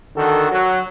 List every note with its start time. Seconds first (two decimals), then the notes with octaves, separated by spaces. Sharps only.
0.16 D3 D#3 F#4 A4
0.50 F#3